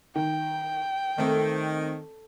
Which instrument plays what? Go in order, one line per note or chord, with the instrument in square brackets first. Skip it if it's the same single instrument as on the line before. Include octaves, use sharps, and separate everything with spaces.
[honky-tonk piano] D#3 [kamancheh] G5
[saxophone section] D#3 [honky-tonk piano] A3 C4 [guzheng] A4 D5